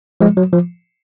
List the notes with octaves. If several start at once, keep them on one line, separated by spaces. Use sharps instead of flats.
F3 G#3
F#3
F3